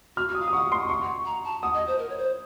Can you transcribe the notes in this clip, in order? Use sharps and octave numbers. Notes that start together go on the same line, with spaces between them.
F#4 F6
F#4
D#6
F5
D#6
F#5 C#6
C6
C#6
A#5
A5
F#5 D#6
D#5
C5
A#4
C#5
C5